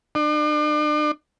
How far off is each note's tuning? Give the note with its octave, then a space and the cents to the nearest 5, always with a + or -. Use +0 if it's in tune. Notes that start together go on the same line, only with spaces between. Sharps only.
D4 +40